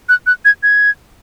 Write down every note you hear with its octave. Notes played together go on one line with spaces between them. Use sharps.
F#6
F#6
G#6
G#6